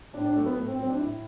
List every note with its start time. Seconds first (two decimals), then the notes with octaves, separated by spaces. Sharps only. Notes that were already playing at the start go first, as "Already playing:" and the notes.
0.14 A2 D4
0.25 D4
0.35 F#3 A3
0.46 B3
0.57 A2 A3
0.67 C4
0.78 F#3 C4
0.89 D4
0.99 A2 E4